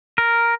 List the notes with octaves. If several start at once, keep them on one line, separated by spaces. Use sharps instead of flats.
A#4